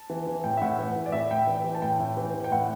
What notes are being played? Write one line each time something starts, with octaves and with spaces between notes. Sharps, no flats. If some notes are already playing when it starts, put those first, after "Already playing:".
Already playing: A5
E3
E3
A2 G5
E5
A2 F#5
E3
E3
D5
A2 E5
A2 G5
E3
E3
A5
A2 G5
A2
E3
E3
G5
A2 F#5